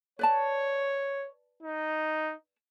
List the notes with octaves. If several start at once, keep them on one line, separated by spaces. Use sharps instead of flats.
B4 C#5 D5 A5
D#4